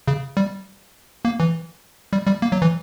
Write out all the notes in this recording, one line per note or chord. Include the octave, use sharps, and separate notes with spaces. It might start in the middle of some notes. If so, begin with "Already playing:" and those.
C#3
G3
A#3
E3
G3
G3
A#3
F#3
E3